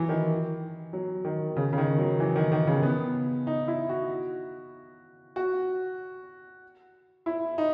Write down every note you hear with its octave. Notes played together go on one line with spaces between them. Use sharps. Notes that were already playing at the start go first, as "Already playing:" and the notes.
Already playing: E3 F#3
D#3
F#3
D#3
C#3
C#3
D#3
F#3
E3
D#3
D#3
C#3
B3
D#4
E4
F#4
F#4
E4
D#4